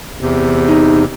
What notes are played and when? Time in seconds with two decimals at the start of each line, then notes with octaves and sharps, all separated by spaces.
0.21 E2 C3
0.67 D#4